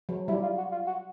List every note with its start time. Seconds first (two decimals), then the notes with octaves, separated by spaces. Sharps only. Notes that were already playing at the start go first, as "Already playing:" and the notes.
0.09 F#3
0.28 G3 E4
0.42 F4
0.58 F#4
0.72 F4
0.87 F#4